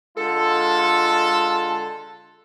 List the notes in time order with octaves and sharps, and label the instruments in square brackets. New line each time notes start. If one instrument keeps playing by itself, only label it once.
[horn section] D3 G#3 F4 A4